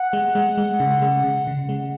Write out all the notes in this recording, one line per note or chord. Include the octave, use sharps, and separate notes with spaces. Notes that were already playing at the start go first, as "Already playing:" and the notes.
Already playing: F#5
G#3
G#3
G#3
C#3
G#3
C#3
C#3
G#3